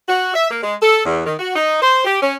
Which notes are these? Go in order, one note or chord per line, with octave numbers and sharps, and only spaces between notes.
F#4
E5
A#3
G#3
A4
E2
D#3
F#4
D#4
C5
G4
C#4